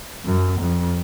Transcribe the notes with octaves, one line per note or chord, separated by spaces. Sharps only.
F#2
F2